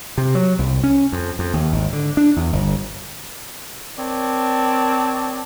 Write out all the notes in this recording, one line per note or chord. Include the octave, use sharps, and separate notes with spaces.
C3
F#3
C2
C#4
F2
F2
D#2
G#1
D3
D4
E2
G1
C4 A#4 C#5 D5 A5